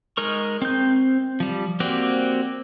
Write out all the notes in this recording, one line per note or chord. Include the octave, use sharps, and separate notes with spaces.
G#3 D#4 A#4 C#6
C4 G6
F3 G3
A#3 C4 F#4 G4 D5